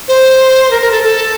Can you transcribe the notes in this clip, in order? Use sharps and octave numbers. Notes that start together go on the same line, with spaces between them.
C5
A#4
A#4
A4
A4